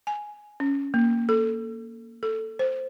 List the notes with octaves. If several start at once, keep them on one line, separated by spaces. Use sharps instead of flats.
G#5
C#4
A#3
A4
A4
C5